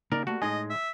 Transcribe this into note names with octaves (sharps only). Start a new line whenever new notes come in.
C#3 A#3 D#4 A#4 D5
G3 A3 A#3 F#4
A2 G#3 D#4 D#5 G#5
E5